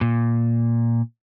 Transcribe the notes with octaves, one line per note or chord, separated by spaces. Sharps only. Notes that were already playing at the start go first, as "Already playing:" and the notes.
A#2